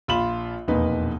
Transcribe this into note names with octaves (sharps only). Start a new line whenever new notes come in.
A#1 F4 F5 B5 E7 F#7
E1 F2 A#2 D#4 B4